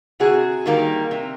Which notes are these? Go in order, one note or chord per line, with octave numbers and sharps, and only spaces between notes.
C3 F#4 G#4
D#3 G3 A#3
C3